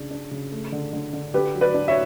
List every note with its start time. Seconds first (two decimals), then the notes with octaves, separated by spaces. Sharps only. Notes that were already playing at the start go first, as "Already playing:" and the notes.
Already playing: C#3 D4
0.11 D4
0.31 C#3
0.51 A3
0.72 D3
0.93 D3
1.13 D3
1.34 D3 G4 B4
1.54 F#3
1.61 B4 D5
1.74 D4
1.88 C#5 E5